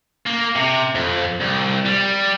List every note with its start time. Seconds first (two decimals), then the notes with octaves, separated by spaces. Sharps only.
0.26 A#3
0.56 C3
0.95 F2
1.41 C2
1.86 G3